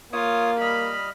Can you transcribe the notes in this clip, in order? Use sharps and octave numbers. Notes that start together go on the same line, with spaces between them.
A#3 F4 C#5 D#6
G3 D#5 B5 F6